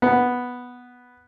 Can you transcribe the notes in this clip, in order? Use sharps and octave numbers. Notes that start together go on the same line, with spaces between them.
B3